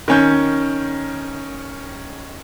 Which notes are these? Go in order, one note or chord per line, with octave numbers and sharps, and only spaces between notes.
D#3 C#4 G6